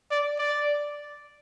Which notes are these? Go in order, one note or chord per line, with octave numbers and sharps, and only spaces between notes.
D5
D5